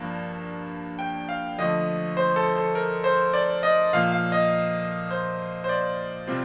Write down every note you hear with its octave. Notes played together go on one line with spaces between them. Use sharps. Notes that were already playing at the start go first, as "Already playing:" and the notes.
Already playing: G2 F3 A#3 D4
G5
F5
D3 F3 A3 D#5
C5
A4
A4
A#4
C5
D5
D#5
A#2 F3 A#3 F5
F5
D#5
C5
C5
D5
C3 G3 C4 F4